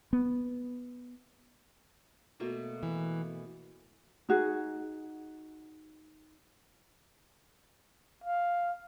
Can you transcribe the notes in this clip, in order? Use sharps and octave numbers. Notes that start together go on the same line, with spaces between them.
B3
B2 A3 A#3
E3
D#4 F#4 G#4
F5